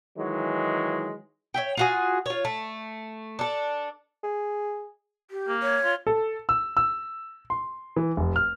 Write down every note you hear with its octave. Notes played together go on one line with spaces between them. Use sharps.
D#3 E3 F#3 G#3
C#5 E5 G5
F4 F#4 G#4
F4 C#5
A3
D4 A4
G#4
G4
A#3
C#5
F4
A4
E6
E6
C6
E3
F1
F6